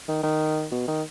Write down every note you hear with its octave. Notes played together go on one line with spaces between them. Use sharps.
D#3
D#3
B2
D#3